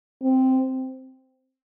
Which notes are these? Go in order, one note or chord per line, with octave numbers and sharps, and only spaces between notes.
C4